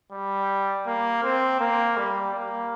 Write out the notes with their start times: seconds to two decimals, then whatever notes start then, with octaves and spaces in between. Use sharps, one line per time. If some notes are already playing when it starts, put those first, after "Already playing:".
0.12 G3
0.86 A#3
1.23 C4
1.60 A#3
1.97 G3
2.34 A#3